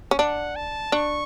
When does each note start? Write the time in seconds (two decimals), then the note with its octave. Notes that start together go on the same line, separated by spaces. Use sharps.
0.11 C#4
0.19 D4 F#5
0.56 A5
0.92 D4 C#6